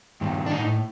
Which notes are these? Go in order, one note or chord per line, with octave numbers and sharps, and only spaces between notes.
G2 D#3
D4
A2 D#4